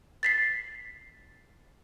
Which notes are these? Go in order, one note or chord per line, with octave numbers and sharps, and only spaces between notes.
A6 B6 C7